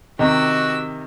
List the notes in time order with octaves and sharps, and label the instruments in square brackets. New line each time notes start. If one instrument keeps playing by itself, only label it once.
[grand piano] C3 D#3 D#5 [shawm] F#4 [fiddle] G4 E6